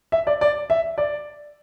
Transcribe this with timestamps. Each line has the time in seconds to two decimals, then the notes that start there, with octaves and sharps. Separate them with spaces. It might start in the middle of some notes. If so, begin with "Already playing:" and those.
0.12 E5
0.27 D5
0.41 D5
0.70 E5
0.98 D5